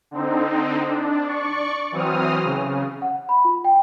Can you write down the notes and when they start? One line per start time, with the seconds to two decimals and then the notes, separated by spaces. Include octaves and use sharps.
0.11 D3 C4 D#4
0.85 D4
1.27 D5 C#6
1.92 E3 F#3 C4 D#6 F6
2.44 C#3
3.02 F#5
3.29 B5
3.45 F4
3.65 G5